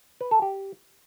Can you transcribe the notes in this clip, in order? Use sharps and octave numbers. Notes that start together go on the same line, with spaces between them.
B4
A4
G4